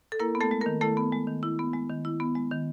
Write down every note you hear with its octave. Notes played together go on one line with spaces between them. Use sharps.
A4
A#3 E4 A#4
B3
A3 A4
G#3
A#3 A#4
D#3
A3 E4 A4
B3
G#3
D#3
E4
B3
G#3
D#3
E4
B3
G#3
D#3